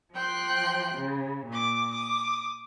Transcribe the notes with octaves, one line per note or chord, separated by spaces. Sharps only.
F3 G5 C6 F#6
C#3
A#2 D6
D6 D#6